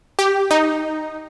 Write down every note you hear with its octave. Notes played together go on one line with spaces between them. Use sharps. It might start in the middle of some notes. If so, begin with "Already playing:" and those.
G4
D#4